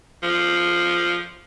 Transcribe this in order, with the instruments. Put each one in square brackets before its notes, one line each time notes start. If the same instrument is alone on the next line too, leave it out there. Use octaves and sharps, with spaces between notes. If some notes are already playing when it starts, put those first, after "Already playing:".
[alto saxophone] F3